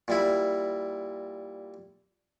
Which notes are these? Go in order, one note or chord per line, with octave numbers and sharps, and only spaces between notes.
A#2 G3 E4